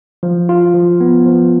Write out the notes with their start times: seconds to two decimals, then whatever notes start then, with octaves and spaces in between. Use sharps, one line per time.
0.23 F3
0.49 F4
0.74 F3
1.01 B3
1.26 F3